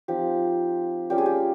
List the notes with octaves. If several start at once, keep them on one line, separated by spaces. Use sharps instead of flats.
F3 C4 D#4 G4
G3 A#3 C#4 F4 G4
G#4
G4